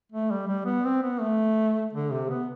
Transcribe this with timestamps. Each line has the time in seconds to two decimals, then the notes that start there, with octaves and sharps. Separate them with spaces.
0.12 A3
0.31 G3
0.48 G3
0.66 B3
0.85 C4
1.02 B3
1.21 A3
1.93 D3
2.11 C3
2.30 B3